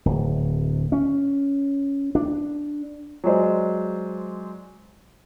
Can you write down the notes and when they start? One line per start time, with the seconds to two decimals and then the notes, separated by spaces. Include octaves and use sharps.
0.05 D1
0.92 C#4
2.15 D4
3.24 F#3 G#3 C5 D5